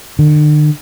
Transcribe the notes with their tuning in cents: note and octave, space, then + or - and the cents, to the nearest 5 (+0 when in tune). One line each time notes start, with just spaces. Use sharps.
D3 +45